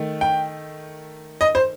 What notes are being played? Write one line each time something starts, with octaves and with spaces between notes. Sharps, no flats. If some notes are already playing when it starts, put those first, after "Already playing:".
Already playing: D#3 A3
G5
D#5
C5